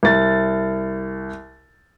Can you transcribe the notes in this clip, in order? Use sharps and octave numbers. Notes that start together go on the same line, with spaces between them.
C2 A6